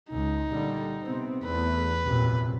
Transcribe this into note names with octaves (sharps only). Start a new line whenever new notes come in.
C#2 D#4
A#2 D3 G3
C3 B3 C4
E2 A3 B4
A#1 F#2 C3